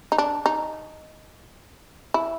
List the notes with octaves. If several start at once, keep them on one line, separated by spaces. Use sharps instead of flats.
D#4
D4
D#4
E4